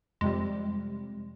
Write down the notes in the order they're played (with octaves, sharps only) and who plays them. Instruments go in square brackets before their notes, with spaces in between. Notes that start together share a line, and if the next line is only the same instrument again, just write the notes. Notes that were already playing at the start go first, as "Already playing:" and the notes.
[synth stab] F2 C3 G3 [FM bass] G#3